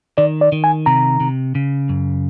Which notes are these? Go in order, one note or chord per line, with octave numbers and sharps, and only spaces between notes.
D#3 D5
D5
D#3
G#5
C3 A#5
C3
C#3
F#2